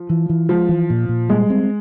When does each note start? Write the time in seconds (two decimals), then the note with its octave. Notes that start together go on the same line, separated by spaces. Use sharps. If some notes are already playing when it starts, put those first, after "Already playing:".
Already playing: F3
0.10 E3
0.29 E3
0.49 F3 G#3
0.69 E3
0.90 A#2
1.09 A#2
1.29 G3 G#3
1.50 C4